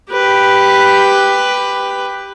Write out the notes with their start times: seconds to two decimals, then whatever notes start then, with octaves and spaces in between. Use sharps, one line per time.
0.11 G4 B4